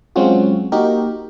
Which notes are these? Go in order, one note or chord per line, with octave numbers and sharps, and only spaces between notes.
F#3 G#3 C4 C#4 F4 F#4
A#3 D#4 F#4 G4 A#4